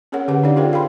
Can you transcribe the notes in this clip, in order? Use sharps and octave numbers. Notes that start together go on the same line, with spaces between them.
C#4 G#4 A#4 C#5 F#5
D3 G4 B4 F#5
D4 D#4 G4 A4 D5 F5
F4 G4 G#4 A#4 C5 G5
G#4 F5 G5 B5 C6